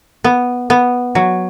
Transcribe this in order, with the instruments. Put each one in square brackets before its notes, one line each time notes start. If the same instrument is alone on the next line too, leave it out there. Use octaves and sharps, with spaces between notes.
[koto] B3
B3
F#3